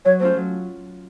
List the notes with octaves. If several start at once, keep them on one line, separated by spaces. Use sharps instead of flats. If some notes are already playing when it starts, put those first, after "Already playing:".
F#3 C#5
A3 C#4 F4 A4 C5
F#3